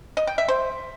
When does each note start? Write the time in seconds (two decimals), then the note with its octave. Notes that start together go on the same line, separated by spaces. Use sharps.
0.17 D#5
0.27 G5
0.38 E5
0.48 C5